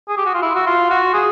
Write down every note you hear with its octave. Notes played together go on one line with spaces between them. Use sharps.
G#4
G4
F#4
F4
E4
F#4
F4
F#4
G#4